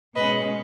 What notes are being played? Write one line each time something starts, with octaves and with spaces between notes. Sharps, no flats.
B2 G#3 C#4 B4 D#5